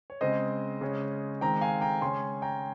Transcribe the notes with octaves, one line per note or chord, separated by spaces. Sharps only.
C#5
C#3 G#3 C4 C5 D#5
C#3 G#3 C#4
D#3 G#3 C4 G5 A#5
F5 G#5
G5 A#5
C#3 G#3 C#4 G#5 C6
G5 A#5